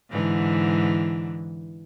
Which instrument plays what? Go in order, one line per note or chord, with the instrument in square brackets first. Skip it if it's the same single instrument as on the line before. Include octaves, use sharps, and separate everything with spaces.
[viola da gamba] G#2 D3 E3